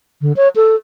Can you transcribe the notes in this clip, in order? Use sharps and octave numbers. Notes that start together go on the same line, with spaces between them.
D3
C#5
A4